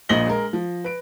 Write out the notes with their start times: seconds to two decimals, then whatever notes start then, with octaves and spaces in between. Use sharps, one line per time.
0.09 A#1 A#2 D#5 A#6 F#7 G7
0.27 G#3 A#4
0.53 F3
0.84 B4 D7